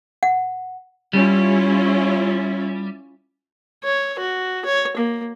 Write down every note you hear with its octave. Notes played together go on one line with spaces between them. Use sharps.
F#5
G3 C#4 E4 F4
C#5
F#4
C#5
A#3